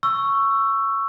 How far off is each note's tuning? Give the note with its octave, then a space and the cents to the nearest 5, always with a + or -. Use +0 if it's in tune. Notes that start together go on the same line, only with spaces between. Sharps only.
C#6 +0 E6 +15